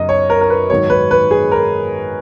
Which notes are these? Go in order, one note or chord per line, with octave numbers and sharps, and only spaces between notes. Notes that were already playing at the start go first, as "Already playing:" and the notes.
Already playing: F#2 C#3 D#5
C#5
A#4
A#4
B4
G#2 D#3 F#3 C#5
B4
B4
G#4
A#4